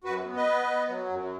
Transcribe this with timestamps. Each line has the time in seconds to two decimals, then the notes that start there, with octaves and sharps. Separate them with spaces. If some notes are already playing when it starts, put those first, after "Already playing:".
0.04 F#2 F#4 B4
0.25 B3
0.36 B4 D#5
0.46 B3
0.67 B3
0.89 F#3
1.10 F#2